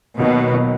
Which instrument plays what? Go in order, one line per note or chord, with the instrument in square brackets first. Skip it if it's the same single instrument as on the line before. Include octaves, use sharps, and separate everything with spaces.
[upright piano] D#2 D#3 F#3 B3 D#4 [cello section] B2
[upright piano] D#3 F#3 B3 D#4